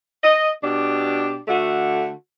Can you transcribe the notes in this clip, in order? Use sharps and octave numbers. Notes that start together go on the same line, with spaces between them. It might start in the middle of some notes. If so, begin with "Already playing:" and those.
D#5
B2 D4 G4
D3 A3 F#4